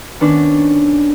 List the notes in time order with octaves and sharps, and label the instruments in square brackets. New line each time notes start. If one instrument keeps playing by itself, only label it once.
[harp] D#3 B3 C#4 D4 B4